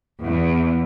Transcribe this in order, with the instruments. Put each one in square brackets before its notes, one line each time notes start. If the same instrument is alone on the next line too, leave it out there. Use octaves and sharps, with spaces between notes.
[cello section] E2